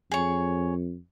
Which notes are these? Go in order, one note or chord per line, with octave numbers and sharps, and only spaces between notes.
F2 G#4 C#5